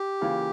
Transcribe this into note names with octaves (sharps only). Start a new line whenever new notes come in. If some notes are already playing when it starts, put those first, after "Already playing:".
Already playing: G4
C#3 E3 A#3 F4